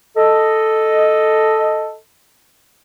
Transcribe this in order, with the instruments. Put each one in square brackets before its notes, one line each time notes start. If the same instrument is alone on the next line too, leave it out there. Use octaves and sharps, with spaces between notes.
[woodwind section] A4 D#5